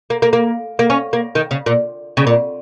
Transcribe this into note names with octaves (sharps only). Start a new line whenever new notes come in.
A#3
A#3
A#3
A#3
C#4
A#3
D#3
C#3
A#2
C#3
A#2